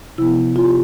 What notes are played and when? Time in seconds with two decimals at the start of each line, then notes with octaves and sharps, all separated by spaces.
0.18 C3 F3 B3 E4
0.56 F4
0.65 G4